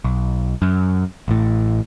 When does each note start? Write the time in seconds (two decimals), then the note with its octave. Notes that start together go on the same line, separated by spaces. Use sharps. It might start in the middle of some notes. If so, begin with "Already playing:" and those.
0.04 B1
0.62 F#2
1.28 A1 A2